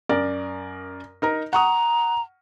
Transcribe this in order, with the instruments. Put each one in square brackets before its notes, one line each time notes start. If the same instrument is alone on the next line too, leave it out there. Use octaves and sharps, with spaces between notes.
[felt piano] F#2 A#4 D5
D#4 A#4 A#5
[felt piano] F#5 C#6 D#6 [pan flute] A#5